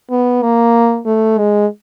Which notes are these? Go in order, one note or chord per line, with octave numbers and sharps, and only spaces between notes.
B3
A#3
A3
G#3